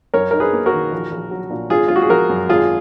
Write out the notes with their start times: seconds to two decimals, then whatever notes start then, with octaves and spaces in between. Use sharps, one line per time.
0.14 F#2 A#4 C#5
0.31 D#4 A#4
0.40 G#4 B4
0.53 A#3
0.66 F#4 A#4
0.73 D#3
0.92 A#1
1.12 A#1
1.31 F#3
1.50 A#2
1.70 G#1 F4 G#4
1.88 G#3 F4
1.96 F#4
2.02 G#4
2.09 F3 F#4 A#4
2.29 F#2
2.49 G#1 F4 G#4